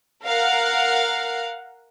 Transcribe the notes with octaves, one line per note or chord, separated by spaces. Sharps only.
A#4 F5 F#5